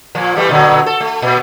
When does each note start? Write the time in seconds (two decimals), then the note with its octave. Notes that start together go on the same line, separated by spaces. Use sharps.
0.15 A#2 F3
0.36 E3 G3 A3
0.49 A#2 D3 F#3
0.86 A4
1.00 A3
1.22 A#2